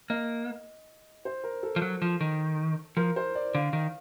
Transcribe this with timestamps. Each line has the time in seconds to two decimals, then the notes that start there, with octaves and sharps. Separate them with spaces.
0.10 A#3 D#5
1.25 C5
1.44 A#4
1.63 A4
1.76 F3
1.82 F#3
2.02 F3
2.21 D#3
2.97 F3 A#4
3.16 C5
3.35 D5
3.55 D3 F5
3.73 D#3